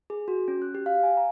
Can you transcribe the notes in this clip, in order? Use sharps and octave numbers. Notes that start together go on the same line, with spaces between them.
G#4
F#4
C#4
F#6
G4
F5
G#5
A#5